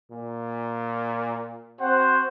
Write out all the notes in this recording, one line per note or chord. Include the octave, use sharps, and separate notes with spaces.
A#2
C4 F#4 C5 F#5